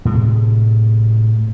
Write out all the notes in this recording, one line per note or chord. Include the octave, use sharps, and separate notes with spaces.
A2 C3 G#3